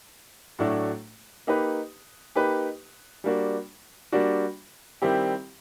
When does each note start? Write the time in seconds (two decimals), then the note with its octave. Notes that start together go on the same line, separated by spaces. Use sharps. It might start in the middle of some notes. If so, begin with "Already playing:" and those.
0.59 A2 F#3 A3 D4 F#4
1.47 A#3 D#4 G4 B4
2.36 A#3 D#4 G4 B4
3.24 G3 A#3 D4 F#4
4.12 G3 A#3 D4 F#4
5.02 D#3 G3 C4 E4 G4